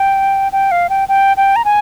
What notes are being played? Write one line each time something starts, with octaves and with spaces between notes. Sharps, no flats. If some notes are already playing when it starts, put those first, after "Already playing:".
Already playing: G5
G5
F5
G5
G5
G5
A#5
G#5